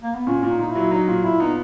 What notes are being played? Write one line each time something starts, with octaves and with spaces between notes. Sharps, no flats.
A#3
B3
A#2 C#4
A#2
D#4
A#2 D#4
F#3 E4
F#3 D#4
A#2
A#2 E4
B3 D#4